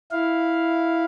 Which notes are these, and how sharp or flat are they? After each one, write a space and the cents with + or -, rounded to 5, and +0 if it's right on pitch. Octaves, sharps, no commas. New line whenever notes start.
E4 +0 F5 +0